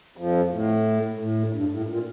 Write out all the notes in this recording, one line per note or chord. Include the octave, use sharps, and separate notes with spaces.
F2 F3
A2
A2
G2
A2
A#2